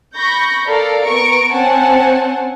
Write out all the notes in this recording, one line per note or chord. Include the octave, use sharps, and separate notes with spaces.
B5 C#6 G6 A#6
A4 A#4 D5 F5 A#5
B3 A#5 C#6 D7
C4 C#4 C5 F#5 G#5 A5